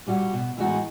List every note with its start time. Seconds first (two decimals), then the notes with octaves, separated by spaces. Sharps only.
0.07 A#2 G3 F#4
0.33 B2
0.57 A2 E3 G#3 D#4 F#4